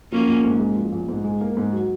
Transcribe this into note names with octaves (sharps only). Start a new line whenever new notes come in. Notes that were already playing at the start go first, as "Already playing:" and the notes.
F3 A#3 C#4
A#1
G#2
G#3
F3
A#1
G#2
G#3
A#3
G#2
F#3